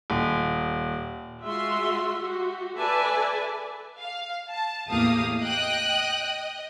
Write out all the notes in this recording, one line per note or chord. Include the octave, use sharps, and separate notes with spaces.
D#1
G#3 F4 F#4 E5 C6
F#4 G4
A4 B4 D5 E5 G#5 A5
F5
A5
E2 A2 A#3 G4 F5 D#6
D#5 G5 D#6 F#6
D#5